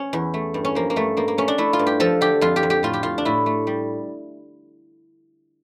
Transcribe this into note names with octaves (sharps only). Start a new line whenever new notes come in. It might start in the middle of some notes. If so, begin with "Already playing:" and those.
Already playing: C#4
E2
A3
G2
C#4
F3 A#3
A#3
G2 A3
G2 A#3
A#3
A3 C#4
D4
A3 E4
F4
G2
G4
F3 A4
D3 G4
F2 F4
G4
F2
G4
A2 F4
G4
A2 F4
D4
A2 E4
A3
G3